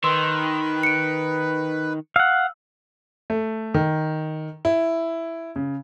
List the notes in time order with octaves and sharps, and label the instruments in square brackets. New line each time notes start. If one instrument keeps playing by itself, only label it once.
[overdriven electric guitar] D#3 [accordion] B4 [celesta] C6 E6
[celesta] C#7 D7
[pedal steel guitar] F5 F#5 [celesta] E6
[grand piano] A3
D#3
E4
C#3